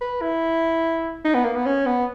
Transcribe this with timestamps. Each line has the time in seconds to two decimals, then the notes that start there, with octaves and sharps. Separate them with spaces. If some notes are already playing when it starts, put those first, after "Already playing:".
0.01 B4
0.21 E4
1.25 D#4
1.34 B3
1.45 A#3
1.56 B3
1.66 C#4
1.86 B3